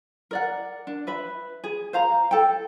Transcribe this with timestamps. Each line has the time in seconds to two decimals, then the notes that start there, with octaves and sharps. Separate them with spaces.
0.31 A#4 D5 F#5
0.87 D4
1.07 B4 E5 B5
1.64 G#4
1.93 C5 F5 A#5
2.31 A4 G5